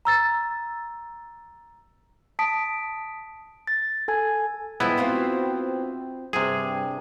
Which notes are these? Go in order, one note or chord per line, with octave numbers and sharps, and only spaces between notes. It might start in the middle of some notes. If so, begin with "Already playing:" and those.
A#5 E6 A6
A5 D#6 B6 D7
A6
A4 G#5 G#6
G2 F3 G#3 B3 E4
C4 F4 F#4
G2 C3 G#4